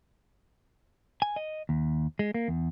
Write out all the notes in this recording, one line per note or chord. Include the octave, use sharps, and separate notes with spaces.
G#5
D#5
D#2
G#3
A#3
E2